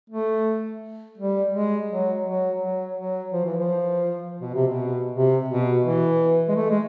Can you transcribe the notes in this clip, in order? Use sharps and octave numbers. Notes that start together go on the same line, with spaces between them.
A3
G3
G#3
F#3
F#3
F#3
F#3
F3
E3
F3
B2
C3
B2
C3
B2
E3
G#3
A3
G#3